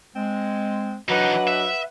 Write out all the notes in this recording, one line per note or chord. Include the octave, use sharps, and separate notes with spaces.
G#3 C4
E3 F#3 D4 D#4 B4 D#5 F#5
E5